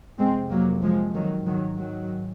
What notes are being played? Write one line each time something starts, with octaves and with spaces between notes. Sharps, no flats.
F2 C3 G#3 C4
F#3 A#3
F3 G#3
D#3 F#3
G#2 D#3 F#3
D#3 F#3